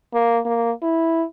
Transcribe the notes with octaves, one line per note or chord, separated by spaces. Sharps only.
A#3
A#3
E4